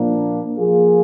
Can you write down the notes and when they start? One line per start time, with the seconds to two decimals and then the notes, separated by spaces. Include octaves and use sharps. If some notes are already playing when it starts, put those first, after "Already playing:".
Already playing: A#2 F3 A#3 D4
0.57 F3 A#3 F4 G#4